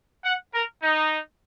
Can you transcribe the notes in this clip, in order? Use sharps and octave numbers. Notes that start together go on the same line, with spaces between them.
F#5
A#4
D#4